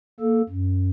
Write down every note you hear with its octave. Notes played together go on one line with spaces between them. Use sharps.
A#3 A4
F#2